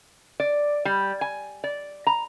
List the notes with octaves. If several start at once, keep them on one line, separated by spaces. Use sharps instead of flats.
D5
G3
G#5
D5
A#5